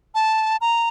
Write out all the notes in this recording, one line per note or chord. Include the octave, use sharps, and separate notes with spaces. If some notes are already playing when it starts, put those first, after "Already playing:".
A5
A#5